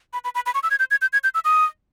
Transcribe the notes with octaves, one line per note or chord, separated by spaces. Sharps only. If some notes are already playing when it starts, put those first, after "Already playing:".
B5
B5
B5
B5
C#6
E6
G#6
G6
G#6
G6
G#6
G6
E6
D#6